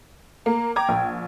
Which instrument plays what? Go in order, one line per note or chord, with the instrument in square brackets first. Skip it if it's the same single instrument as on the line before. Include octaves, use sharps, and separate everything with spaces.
[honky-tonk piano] A#3 [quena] A#5
[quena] G5 [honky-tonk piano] A#5 D6 G#6
[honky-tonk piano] A#1